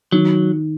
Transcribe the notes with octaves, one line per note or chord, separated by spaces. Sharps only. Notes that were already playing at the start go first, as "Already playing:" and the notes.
D#3 F#3